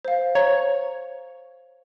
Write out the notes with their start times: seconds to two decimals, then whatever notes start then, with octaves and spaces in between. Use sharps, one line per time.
0.05 C5 F5
0.35 C#5 A#5